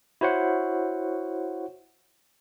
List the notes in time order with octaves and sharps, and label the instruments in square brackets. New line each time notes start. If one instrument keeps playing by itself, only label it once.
[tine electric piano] E4 F#4 C5 C#5 F#5